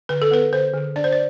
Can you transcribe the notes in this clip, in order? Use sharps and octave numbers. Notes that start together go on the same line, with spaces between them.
D3 B4
A4
B3 B4
D3 C5
D3
D4 D5
C5
D5